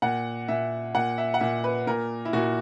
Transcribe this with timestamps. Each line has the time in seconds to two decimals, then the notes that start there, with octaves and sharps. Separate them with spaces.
0.02 A#2 F#5
0.48 A#2 E5
0.94 A#2 F#5
1.18 E5
1.34 F#5
1.40 A#2 E5
1.64 B4
1.87 A#2 A#4
2.25 E4
2.33 A#2 F#4